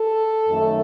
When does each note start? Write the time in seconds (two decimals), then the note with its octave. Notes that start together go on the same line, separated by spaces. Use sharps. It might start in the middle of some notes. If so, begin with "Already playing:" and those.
Already playing: A4
0.49 F#2 D#3 A3